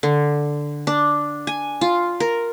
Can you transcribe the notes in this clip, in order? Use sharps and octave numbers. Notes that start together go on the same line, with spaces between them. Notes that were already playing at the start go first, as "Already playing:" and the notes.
D3
D4
G#5
F4
A#4